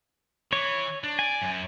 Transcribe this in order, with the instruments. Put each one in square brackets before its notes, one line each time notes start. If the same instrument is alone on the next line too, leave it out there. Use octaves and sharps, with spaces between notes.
[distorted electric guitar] E3 [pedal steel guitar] C#5
[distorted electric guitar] D4
[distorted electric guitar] D5 [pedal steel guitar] G#5
[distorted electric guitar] F#2